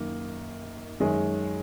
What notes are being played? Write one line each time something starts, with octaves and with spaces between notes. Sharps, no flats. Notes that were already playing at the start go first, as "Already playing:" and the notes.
Already playing: F#2 D#3 A#3
F#2 D#3 G#3 C#4